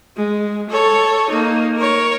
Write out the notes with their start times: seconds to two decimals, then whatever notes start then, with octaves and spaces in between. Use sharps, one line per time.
0.16 G#3
0.69 A4 C#5
1.30 A#3 D#4
1.76 A#4 C#5